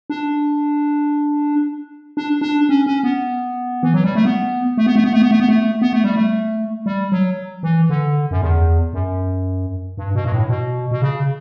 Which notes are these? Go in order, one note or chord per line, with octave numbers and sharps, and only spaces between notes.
D4
D4
D4
C#4
C#4
B3
E3
F#3
G3
A3
B3
A3
B3
A3
B3
A3
B3
A3
B3
A3
B3
A3
G3
A3
G3
F#3
E3
D3
F#2
E2
F#2
G2
B2
G2
A2
B2
B2
C#3